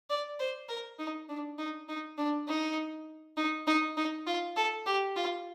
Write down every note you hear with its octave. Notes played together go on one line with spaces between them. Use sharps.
D5
C5
A#4
D#4
D4
D#4
D#4
D4
D#4
D#4
D#4
D#4
F4
A4
G4
F4